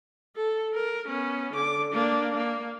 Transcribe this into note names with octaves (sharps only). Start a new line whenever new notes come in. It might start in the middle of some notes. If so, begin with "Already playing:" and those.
A4
A#4
B3 C#4
D3 D6
A#3 D4
A#3